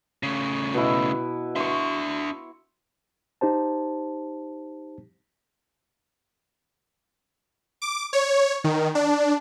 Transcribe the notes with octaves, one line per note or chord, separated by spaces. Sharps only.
C#3 A3
B2 E4
D4 E5 C6 C#6
D#4 G4 C5 A5
D6
C#5
D#3
D4